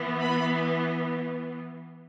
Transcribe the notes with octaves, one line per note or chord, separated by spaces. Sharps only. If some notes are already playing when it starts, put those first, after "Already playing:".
Already playing: E3 B3
B5